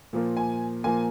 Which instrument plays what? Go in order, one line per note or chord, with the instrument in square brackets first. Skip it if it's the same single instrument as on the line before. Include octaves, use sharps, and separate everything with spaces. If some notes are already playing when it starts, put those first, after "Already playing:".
[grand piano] A#2 F3 A#3
G#5
A#2 F3 A#3 G#5